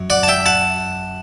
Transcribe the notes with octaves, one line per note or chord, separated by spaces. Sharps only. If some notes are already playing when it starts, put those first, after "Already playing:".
Already playing: F#2
D5 F#5
A5
E5 G5
F#5 A5